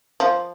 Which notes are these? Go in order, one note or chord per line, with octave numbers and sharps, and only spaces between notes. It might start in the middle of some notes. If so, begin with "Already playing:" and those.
F3